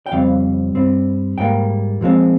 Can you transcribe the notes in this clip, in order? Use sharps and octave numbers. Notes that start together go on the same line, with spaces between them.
G5
F2 C#3 G3 C4 F5
G2 G3 C4
G#2 G3 A#3 G5
A#2 F3 G#3 C4